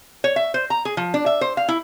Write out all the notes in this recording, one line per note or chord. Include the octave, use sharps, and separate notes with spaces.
C#5
E5
C5
A#5
G#4
F3
D4
E5
C5
F5
E4